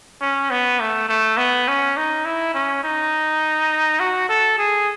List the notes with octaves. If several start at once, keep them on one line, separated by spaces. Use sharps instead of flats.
C#4
B3
A3
A3
B3
C#4
D#4
E4
C#4
D#4
F#4
A4
G#4